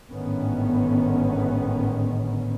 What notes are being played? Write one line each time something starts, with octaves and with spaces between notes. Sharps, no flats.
G#1 A2 D3 D#3 B3 C#4